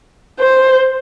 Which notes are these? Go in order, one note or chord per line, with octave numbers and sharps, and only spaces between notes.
C5